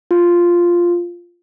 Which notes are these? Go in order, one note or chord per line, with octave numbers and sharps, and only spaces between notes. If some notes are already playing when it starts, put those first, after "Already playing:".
F4